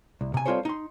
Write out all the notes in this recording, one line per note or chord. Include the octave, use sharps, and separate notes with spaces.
C2
C3 G#5
G3 C4 F4 A4 C5 C#5
D#4 C6